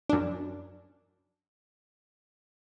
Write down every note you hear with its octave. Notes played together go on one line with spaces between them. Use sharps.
F#2 D4